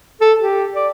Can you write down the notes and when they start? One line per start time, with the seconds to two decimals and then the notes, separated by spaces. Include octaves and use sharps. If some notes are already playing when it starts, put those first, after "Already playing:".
0.21 A4
0.40 G4
0.74 D5